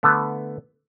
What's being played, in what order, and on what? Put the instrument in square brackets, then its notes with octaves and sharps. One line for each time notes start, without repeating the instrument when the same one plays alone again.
[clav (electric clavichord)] D3 A3 B3